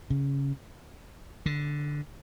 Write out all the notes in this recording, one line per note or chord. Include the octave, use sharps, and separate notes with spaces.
C#3
D3